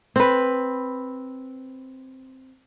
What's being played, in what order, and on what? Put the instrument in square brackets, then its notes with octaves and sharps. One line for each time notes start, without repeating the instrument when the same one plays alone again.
[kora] C4 B4